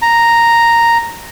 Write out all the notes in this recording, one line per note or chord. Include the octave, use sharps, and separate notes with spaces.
A#5